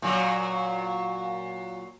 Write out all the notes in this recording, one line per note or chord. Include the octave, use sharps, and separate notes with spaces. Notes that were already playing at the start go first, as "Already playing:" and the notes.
A#2 F#3